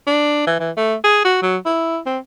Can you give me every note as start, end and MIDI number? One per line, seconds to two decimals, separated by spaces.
0.07 0.46 62
0.47 0.58 52
0.60 0.71 52
0.77 0.95 57
1.04 1.21 68
1.25 1.38 66
1.43 1.57 54
1.66 1.99 64
2.06 2.19 60